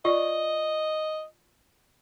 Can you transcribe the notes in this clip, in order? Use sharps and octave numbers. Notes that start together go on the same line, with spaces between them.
F4 D5 D#5